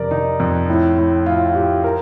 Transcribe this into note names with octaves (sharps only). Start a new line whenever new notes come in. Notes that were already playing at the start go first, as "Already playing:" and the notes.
Already playing: F2 C3 A#4 D5
D#3 D#4
F2
A2
A2
A2 F4
F4
A2 G4
A#4